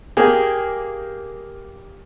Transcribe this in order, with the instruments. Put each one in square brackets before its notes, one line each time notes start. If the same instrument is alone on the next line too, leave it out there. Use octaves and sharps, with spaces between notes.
[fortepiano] A#3 G#4 [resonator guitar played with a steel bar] G4